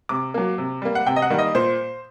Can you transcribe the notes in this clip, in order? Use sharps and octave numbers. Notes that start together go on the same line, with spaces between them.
C3 D6
F#3 A#3
C3
G3 A#3
F#5
C3 G5
D#5
F#5
D#3 G3 A#3
D#5
A#2 C5